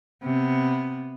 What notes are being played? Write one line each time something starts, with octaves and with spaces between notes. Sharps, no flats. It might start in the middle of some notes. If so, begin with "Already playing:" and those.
C3 B3